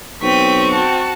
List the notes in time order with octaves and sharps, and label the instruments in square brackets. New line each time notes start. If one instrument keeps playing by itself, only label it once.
[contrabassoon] B1 [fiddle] C4 G5 [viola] C#6 [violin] B6 D#7
[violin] F#4 A5